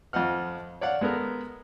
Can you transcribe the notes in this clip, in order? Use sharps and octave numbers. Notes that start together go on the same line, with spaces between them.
F2 F3 D#5 F#5 F6
C#5 D5 F5 F#5
G#3 B3 A4 A#4